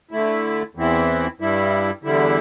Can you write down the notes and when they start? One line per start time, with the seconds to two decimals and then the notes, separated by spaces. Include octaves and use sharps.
0.11 D3 A3 E4
0.75 E2 E3 C4 E4
1.40 G2 G3 E4
2.03 E2 D3 G3 E4